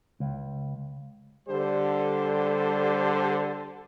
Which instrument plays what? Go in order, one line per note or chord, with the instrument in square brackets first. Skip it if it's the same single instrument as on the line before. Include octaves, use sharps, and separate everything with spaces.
[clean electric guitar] C#2
[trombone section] D3 G3 G4 A4 C5